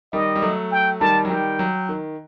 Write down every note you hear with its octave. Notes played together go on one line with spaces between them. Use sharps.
D#3 G3 D#5
G3
F#3 A3
G5
D#3 G3 A5
F#3
D#3 G3 G5
F#3
D#3